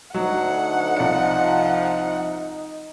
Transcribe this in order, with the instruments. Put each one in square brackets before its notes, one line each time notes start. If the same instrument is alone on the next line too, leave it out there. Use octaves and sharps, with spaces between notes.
[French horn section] D2 [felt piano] F#3 [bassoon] D#4 [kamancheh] F#5
[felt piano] C2 D5 C#7 [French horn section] F3